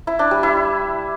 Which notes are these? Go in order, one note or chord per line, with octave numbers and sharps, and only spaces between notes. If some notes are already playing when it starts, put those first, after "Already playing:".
E4
D4
G3
E4